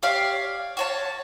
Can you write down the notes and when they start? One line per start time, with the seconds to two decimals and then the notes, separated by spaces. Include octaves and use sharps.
0.03 G4 C#5 D5 F5
0.77 F#4 C#5 A5